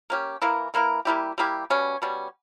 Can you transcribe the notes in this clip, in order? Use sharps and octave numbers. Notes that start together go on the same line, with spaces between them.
A#3 C#4 G4
E3 A#3 E4 A#4
E3 A#3 E4 A#4
G3 A#3 E4 G4
G3 A#3 E4 G4
B2 G3 C#4
B2 G3 C#4